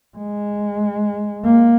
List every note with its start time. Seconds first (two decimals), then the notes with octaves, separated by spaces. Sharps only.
0.17 G#3
1.44 A#3